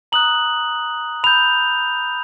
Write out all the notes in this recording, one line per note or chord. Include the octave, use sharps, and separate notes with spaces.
A#5 D#6 F#6 F#7
B5 E6 G6 F7